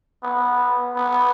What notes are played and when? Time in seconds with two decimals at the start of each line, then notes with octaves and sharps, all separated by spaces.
0.23 B3
0.95 B3